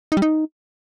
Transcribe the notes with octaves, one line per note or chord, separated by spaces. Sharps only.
D#4
G3
D#4